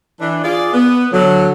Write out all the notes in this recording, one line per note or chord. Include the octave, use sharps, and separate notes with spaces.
E3 D4
F4 G#4 D5
B3
D3 F#3